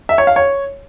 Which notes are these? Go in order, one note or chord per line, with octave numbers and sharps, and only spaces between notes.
E5
C#5
F5
C#5